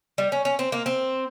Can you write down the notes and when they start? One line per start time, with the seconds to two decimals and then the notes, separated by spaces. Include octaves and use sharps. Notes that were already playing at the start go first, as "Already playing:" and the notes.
0.18 G3
0.32 C#4
0.45 C#4
0.59 C4
0.72 A#3
0.86 C4